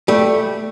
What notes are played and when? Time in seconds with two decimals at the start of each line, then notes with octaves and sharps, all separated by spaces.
0.08 G3 A3